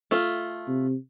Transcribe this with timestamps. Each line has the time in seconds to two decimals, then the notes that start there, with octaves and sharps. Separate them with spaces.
0.11 A3 F4
0.68 C3